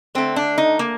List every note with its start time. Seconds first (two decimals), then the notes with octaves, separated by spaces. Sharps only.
0.15 D3 A3 C4
0.36 D4
0.58 D#4
0.79 A#3